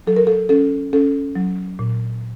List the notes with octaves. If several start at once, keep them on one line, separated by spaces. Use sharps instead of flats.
F#3 A4
A#4
A4
C#4 A4
C#4 A4
F#3
A#2